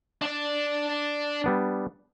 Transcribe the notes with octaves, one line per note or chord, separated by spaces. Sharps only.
D4 D5
G3 B3 D4